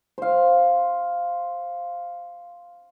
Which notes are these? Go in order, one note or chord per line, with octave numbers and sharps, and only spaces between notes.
C5 F5